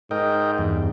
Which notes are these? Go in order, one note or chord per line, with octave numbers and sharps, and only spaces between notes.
G#2 A#4 D#5 G5
E2 G2